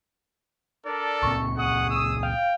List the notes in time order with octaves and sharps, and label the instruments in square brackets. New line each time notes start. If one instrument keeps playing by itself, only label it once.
[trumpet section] D4 A#4 D5 [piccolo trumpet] A4
[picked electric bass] C#2 A#2 C4 [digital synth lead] C#6
[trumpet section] G#4 D#6 [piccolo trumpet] F#5
[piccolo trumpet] E6
[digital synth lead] F5 [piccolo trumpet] G5